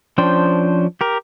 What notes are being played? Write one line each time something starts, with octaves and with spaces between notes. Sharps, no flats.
F3 C#4 D4 C5 G5
G4 A#4